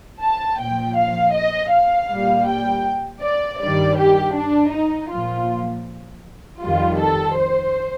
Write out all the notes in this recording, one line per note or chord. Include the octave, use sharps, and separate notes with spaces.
A5
A#2 F3 G5
F5
D#5
F5
A#2 G3
G5
D5
G2 D#3 G3 D5
G4
D4
D#4
A#2 F3 F4
F2 D#3 G3 F4
A4
C5